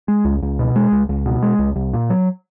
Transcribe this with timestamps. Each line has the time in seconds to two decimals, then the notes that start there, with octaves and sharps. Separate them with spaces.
0.08 G#3
0.25 C#2
0.43 C#2
0.59 B2
0.76 G#3
0.92 C#2
1.09 C#2
1.26 B2
1.43 G#3
1.59 C#2
1.76 C2
1.93 A#2
2.10 F#3